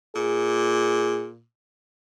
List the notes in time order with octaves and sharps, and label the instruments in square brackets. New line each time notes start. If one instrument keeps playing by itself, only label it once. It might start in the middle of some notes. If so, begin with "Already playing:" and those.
[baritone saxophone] A#2 [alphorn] G#4